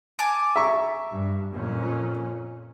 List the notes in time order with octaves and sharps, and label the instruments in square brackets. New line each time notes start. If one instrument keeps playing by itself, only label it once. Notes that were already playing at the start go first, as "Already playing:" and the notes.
[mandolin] G#5 A5 D6
[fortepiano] E5 A#5 C#6
[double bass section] G2
F2 A#2 C#4